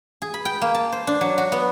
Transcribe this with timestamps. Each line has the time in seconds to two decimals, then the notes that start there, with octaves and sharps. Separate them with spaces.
0.22 G#4
0.34 B5
0.45 G5
0.62 A#3
0.74 A5
0.92 C5
1.07 D4
1.21 F#3
1.38 F#4
1.52 B3